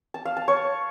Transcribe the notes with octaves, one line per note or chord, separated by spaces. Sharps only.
A5
F5
A5
C#5